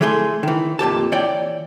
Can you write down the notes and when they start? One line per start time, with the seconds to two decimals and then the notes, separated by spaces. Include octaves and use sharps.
0.01 E3 G#3 A3 G#4 C6
0.43 D#3 E3
0.79 F2 A#2 G4 A5
1.12 E3 C#5 D5 G5